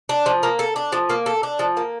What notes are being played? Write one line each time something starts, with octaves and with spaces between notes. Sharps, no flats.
D4
F3
A#3
A4
D4
F3
A#3
A4
D4
F3
A#3